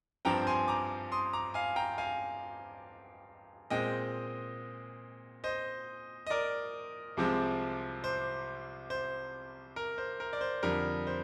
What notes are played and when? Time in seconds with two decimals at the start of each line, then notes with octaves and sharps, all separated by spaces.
0.25 G2 F3 C4 G5 A#5
0.47 G#5 C6
0.68 A#5 D6
1.12 C6 D#6
1.33 A#5 D6
1.54 F5 G#5
1.76 G5 A#5
1.98 F5 G#5
3.70 A#2 G#3 C4 D#5 G5
5.44 C5 D#5
6.27 D#5
6.30 A#4 D5
7.17 C2 C3 F3 G#3 C4
8.04 C5
8.90 C5
9.76 A#4
9.98 C5
10.20 A#4
10.33 D5
10.41 C5
10.63 F2 D3 G3 A#4
11.07 C5